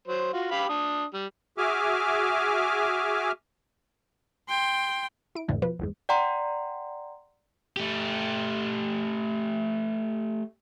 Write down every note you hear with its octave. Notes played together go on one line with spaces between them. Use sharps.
F#3 C5
F4 F#4
G4 F5 B5
D4 D#6
G3
F#4 G#4 E5 G#5 D6 F6
G5 C6
E4 D7
A#1 F2 A2 D3 E3
B2 F3 B4
G1 E2 G#2
D5 F#5 G5 A#5 C6
A3 G4